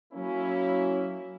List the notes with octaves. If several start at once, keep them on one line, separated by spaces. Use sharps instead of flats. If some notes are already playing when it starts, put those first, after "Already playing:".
F#3 A#3 C#4 E4